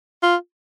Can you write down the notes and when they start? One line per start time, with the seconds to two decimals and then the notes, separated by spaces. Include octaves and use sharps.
0.23 F4